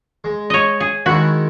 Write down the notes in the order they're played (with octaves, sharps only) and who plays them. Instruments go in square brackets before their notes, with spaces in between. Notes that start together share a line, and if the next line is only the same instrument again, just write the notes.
[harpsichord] G#3
[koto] C#5 D#5
G#4
[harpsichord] D#3 G#3 E4 [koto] F#4